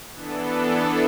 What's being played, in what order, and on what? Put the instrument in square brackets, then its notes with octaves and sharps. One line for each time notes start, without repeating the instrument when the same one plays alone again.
[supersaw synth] E3 B3 D4 A4